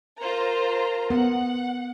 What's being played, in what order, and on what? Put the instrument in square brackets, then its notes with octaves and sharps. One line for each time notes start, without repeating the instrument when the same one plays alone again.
[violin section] F4 C5 A#5 [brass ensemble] A#4
[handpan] B3 [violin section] F#5